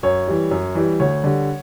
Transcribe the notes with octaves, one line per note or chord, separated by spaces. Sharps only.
F#2 C#5
E3 G3
F#2
E3 G3
D2 C#5
D3 G3